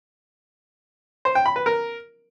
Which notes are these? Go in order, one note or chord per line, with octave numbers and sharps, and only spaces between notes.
C5
G5
B5
B4
A#4